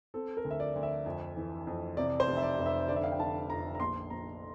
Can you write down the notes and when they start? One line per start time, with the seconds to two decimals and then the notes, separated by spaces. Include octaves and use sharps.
0.14 C4 A4
0.37 A#4
0.44 D2
0.51 E5
0.60 D5
0.75 D2
0.83 E5
1.06 F2
1.36 E3
1.67 F2
1.97 C3 D5
2.20 C5
2.28 F1
2.37 E5
2.43 D5
2.58 F1
2.66 E5
2.88 D3 D5
2.96 E5
3.04 F5
3.12 G5
3.19 D3 A5
3.50 F2 A#5
3.75 A#5
3.80 A#1 C6
4.10 A#1 A#5